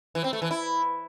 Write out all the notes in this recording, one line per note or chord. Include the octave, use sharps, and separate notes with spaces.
E3
C4
A3
E3
E4